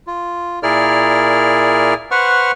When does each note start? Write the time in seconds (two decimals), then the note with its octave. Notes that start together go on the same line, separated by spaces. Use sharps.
0.07 F4
0.63 A#2 E4 G#4 A#4 D5 F6
2.11 B4 C5 F#5 C#6 F6